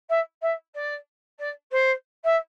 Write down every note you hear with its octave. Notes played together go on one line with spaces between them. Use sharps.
E5
E5
D5
D5
C5
E5